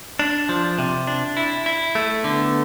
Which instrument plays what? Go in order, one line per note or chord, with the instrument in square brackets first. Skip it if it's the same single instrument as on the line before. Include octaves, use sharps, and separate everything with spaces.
[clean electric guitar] D4
F3
C3
D4
E4
E4
A3
[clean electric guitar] D3 [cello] B3